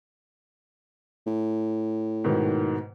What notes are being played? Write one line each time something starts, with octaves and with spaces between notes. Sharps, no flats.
A2
G#2 B2 D#3